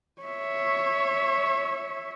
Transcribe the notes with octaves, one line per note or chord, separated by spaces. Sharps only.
C#5 E5